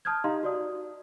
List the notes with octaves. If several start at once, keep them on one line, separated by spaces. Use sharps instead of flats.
A5 D#6 F6 G6 G#6
D#4 G4 D#5 F5 A#5 C6
F#4 D5 D#6